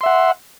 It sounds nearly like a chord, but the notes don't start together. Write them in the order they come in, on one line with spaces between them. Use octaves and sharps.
C6 E5 F#5